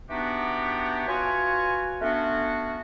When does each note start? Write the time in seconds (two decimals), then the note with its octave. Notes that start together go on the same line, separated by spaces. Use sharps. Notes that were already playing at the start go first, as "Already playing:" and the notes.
0.09 E3 B3 D4 D#4 F#4 G4
1.08 F4 F#4 B4 C#5 G#5
2.01 A3 B3 C#4 D4 F#4